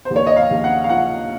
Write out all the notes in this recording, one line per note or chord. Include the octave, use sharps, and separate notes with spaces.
C5
D#2
C#5
D#5
F5
D#2
F#5
F5
F3 F#5